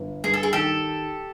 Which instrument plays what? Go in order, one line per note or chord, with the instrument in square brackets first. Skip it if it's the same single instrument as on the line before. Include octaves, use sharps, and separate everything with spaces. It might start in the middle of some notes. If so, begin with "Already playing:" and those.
Already playing: [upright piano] G1
[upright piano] G2 [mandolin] G#4
[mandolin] A4
G#4
[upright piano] D#3 [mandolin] G4 A4